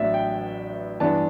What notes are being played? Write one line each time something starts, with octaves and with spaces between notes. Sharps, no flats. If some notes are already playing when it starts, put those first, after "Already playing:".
Already playing: A1 A2 F#3 B3 D4 D5 E5
G5
G2 E3 B3 D4 A5